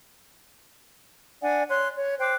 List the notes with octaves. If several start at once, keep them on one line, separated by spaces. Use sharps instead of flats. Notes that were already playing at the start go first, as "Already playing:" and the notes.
D4 D5 F#5 G#5
C#5 C6 F#6
C#5
C5 G5 D6 F#6